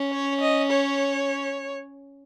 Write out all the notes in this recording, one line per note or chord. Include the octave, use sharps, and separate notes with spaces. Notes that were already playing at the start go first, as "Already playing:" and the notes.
Already playing: C#4
C#5
D#5
C#5